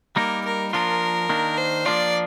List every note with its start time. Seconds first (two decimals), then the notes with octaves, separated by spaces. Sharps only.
0.16 G3 A#3 D#4 A#4
0.45 A#4
0.72 F3 A#3 D4 F4 A#4
1.29 D#3 A#3 D4
1.58 C5
1.85 F3 A#3 D4 F4 D5